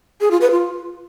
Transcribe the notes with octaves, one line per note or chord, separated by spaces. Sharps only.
G#4
F4
B4
F4